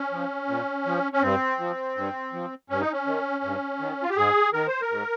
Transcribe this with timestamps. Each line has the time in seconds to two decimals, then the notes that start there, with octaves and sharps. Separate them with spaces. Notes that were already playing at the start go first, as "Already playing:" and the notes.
Already playing: C#4
0.12 F3
0.49 A#2
0.86 F3
1.13 C#4
1.22 G2 C4
1.59 F3
1.97 G2
2.33 F3
2.70 G2 C#4
2.81 D#4
2.92 C#4
3.06 D#3
3.44 G2
3.80 D#3
4.03 F4
4.10 G4
4.17 G#2 G#4
4.53 D#3 A#4
4.67 C5
4.81 A#4
4.90 G#2